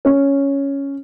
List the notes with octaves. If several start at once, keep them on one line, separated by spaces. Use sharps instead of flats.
C#4